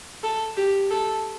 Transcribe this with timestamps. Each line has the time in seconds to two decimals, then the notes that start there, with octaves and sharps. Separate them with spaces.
0.24 A4
0.57 G4
0.90 A4